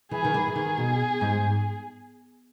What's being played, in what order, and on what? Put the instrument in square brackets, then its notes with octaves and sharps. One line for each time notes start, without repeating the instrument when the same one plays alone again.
[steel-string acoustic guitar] E3 [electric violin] G#4
[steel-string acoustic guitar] D#3
E3
E3
[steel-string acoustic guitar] D#3 [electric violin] G#4
[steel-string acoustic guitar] B2
G#2